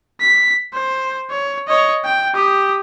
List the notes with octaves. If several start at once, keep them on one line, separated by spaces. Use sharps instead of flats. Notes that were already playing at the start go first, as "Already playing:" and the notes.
B6
C5
C#5
C#5 D#5
G5
G4 D#6